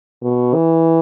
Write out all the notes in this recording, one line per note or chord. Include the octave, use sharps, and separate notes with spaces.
B2
E3